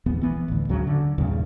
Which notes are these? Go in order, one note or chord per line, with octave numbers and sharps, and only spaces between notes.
D#1 A#1 E2 B3
E3 B3
A1 D2
D2 C#3 F#3
D3
E2 G2 A#2 C#3